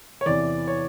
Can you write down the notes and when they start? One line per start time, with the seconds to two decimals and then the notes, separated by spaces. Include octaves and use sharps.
0.21 C#5
0.26 E2 C3 E3 D5
0.67 C#5